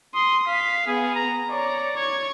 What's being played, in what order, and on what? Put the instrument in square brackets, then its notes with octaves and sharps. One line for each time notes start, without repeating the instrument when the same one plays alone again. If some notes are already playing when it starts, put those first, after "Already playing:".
[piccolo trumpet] C6 [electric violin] D#6
[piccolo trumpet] F5 [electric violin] B6
[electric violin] B3 [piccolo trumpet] G#4
[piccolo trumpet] A#5
[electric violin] C#5 A#5 [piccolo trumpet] D5
[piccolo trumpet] C#5 [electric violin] C#6 G#6